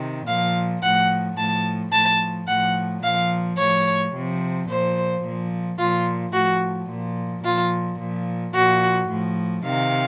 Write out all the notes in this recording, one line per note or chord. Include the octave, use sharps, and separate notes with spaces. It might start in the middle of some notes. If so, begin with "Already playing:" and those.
Already playing: C3 D#3
A#2 F3 F5
A2 F3 F#5
A2 F3 A5
A2 F3 A5
A2 F3 F#5
A#2 F3 F5
A2 F3 C#5
C3 F3
A#2 F3 C5
A#2 F3
A#2 F3 F4
A2 F3 F#4
A#2 F3
A#2 F3 F4
A#2 F3
A#2 F3 F#4
A2 F3
C3 D#3 F5